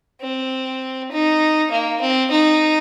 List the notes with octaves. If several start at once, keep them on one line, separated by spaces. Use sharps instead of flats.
C4
D#4
A#3
C4
D#4